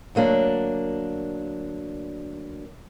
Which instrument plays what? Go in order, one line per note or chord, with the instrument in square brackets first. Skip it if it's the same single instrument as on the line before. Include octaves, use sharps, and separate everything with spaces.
[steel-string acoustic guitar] D2 F#3 A#3 D4